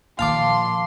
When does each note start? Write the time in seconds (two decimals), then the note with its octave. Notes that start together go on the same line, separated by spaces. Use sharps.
0.19 A#2 D#3 F3 F5 A5 C6 D6